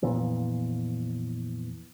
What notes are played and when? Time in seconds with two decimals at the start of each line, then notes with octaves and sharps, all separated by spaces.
0.02 F2 A#2 E3 B3